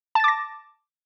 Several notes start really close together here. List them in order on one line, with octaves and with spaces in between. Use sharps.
A5 A6 D6 A#6